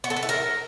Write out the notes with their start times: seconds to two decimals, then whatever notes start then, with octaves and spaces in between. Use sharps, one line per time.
0.04 B3
0.10 A4
0.16 B4
0.23 E4
0.29 A#4